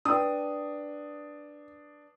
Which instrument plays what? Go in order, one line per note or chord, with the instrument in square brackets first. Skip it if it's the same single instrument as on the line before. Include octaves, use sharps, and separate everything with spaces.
[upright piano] D4 [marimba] B4 G5 A5 [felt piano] D#6